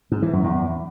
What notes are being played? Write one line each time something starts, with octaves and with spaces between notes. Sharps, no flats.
G#2
E3
F#2
E2